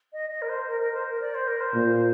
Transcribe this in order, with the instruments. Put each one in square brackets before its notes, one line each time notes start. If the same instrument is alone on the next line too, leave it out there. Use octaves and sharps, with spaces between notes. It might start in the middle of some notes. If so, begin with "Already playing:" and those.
[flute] D#5
D#5
A#4
C5
A#4
A#4
C5
A#4
D5
C5
A#4
C5
[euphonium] A#2